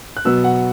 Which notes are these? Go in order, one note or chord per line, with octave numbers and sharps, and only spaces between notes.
F#6
B2 F#3 B3 E6
F#5